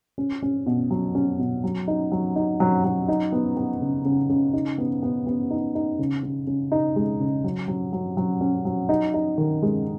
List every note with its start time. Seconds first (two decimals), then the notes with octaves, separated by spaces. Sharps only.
0.18 C#4
0.42 C#4
0.66 B2
0.91 F#3
1.15 C#4
1.39 B2
1.64 F#3
1.88 D#4
2.12 F#3
2.36 D#4
2.60 F#3
2.84 F#3
3.08 D#4
3.32 B3
3.57 B3
3.81 C#3
4.05 C#3
4.29 C#3
4.53 D#4
4.78 B3
5.03 B3
5.27 B3
5.51 D#4
5.75 D#4
5.99 C#3
6.23 C#3
6.47 C#3
6.72 D#4
6.96 G#3
7.20 C#3
7.44 F#3
7.68 F#3
7.93 F#3
8.17 F#3
8.41 C#4
8.65 F#3
8.89 D#4
9.14 D#4
9.38 D#3
9.62 G#3